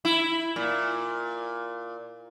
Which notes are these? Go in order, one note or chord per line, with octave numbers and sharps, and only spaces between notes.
E4
A#2